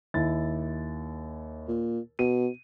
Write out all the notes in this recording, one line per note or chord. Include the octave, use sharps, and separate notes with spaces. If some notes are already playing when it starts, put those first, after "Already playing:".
D#2 E4 A6
A#2
B2 D#7